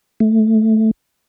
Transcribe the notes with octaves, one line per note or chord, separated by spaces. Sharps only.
A3